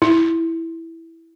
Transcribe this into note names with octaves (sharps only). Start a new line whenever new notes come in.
E4